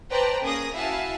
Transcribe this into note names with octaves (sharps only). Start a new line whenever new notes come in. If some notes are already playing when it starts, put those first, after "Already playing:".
B4 C5 D5 G5 A5 A#5
A#3 C#4 G#4 D#6 A#6
E4 F#4 E5 F5 G#5 A5